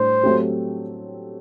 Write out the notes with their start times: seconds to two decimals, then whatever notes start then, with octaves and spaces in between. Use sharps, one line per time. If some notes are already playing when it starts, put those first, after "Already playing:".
Already playing: A2 G3 D4 C5
0.23 F#3 A3 C4 G4